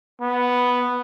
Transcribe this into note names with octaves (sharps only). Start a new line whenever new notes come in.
B3